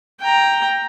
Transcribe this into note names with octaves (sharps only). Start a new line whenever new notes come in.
G5 A#5